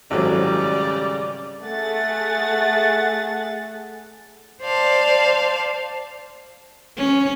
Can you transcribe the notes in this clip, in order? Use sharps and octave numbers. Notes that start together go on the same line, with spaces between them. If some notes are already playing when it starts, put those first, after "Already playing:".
G#1 C#3 F#3 G3 E4 A4 C5 D5
A3 G#4 F#5 A6
C5 D5 F5 A5
C#4